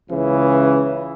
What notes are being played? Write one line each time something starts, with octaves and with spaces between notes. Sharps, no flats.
C#2 C#3 E3